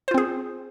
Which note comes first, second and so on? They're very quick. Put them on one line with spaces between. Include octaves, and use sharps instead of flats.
C5 F4 C4 G#4